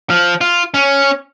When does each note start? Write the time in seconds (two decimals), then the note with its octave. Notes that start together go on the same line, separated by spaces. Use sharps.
0.10 F3
0.41 F4
0.74 C#4